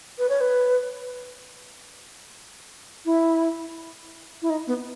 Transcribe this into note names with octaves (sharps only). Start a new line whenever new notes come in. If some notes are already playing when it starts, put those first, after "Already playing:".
B4
C#5
B4
E4
E4
D#4
B3